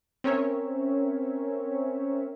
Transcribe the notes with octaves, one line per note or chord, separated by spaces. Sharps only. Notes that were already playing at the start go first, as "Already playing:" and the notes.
C4 C#4 A#4 C#5 E5